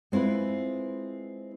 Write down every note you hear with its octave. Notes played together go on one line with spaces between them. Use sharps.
G#3 C4 E4 F4 B4